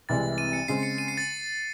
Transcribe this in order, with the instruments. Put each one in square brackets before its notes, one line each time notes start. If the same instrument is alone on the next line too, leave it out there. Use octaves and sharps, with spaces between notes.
[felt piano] C2 C3 E3 G#3 [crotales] A6
[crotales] D#7
C#7
[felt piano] C#3 G#3 C4 [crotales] C7
[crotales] C#7
D#7
C7
A6